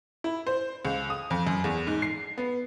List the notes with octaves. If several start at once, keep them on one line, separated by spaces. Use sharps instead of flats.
E4
C5
C#2
D#6
F2
F#2
E2
G#2
C7
B3